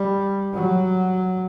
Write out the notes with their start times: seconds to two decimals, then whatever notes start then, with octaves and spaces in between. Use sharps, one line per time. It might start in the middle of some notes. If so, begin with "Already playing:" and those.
Already playing: G3
0.55 F#3